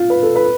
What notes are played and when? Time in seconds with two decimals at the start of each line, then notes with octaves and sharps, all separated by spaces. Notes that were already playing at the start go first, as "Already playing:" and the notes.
Already playing: F4
0.10 B4
0.23 A4
0.36 B4